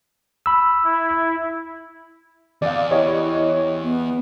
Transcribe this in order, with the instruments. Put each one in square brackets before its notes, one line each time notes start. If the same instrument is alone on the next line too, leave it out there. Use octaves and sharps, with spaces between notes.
[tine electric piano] B5 E6
[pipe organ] E4
[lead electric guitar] E2 [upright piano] D5 F5
[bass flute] E4 [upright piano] G4 C#5 D#5
[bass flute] B3